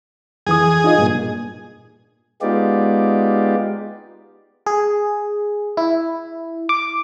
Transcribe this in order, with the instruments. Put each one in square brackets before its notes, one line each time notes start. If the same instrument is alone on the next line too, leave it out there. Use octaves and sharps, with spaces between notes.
[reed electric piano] F2 E3 D#6 [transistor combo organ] G#4
[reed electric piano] D#4 F4 D#5
G2 A#2
[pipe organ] G#3 B3 D#4 F4 G4 D5
[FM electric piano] G#4
E4
D6